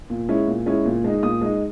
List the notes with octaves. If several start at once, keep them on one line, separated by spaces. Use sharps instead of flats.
A#2
G#3 C#4 E4
A#2
G#3 C#4 E4
A#2
G#3 D#4
A#2 D#6
G#3 D#4